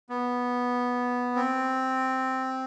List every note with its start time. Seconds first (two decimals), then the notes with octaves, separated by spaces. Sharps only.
0.10 B3
1.35 C4